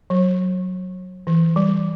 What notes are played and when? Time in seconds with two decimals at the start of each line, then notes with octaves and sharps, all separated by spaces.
0.10 F#3
1.27 E3
1.56 G3